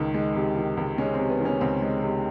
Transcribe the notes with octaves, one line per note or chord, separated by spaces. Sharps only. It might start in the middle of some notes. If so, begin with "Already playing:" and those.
Already playing: C#2 D#3 D#4
G#3
C3
D#3
C#2
G#3 C#4
C4
C3
B3
D#3
C#4
C#2 C4
G#3
C3